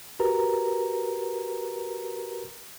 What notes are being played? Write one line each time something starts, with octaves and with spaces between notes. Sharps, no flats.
F#4 G4 A#4 B4 A#5